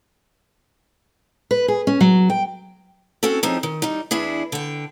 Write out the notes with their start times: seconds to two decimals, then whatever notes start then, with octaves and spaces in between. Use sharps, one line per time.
1.51 B4
1.68 G#4
1.87 C#4
2.01 F#3
2.30 G5
3.23 C4 C#4 F#4 A4
3.43 F3 C4 C#4 D#4 G#4
3.63 D#3
3.82 G3 D#4
4.11 E2 D4 E4 G#4
4.52 D3 G5